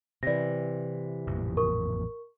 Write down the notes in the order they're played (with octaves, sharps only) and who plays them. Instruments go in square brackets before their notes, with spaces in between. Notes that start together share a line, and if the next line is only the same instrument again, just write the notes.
[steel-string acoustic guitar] C3 E3 [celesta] D5 A#6
[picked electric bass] A1 F2 A#2
[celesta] A#4 C#6